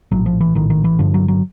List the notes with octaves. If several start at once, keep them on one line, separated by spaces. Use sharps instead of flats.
A#1 A2 F#3
F3
E3
A#1 A2 D#3
D#3
E3
G1 G2 D3 F3
F#3
F#3